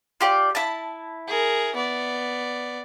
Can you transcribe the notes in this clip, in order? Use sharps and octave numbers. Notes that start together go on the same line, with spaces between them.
F4 G4 D5
E4 A5
G#4 A#4
B3 D5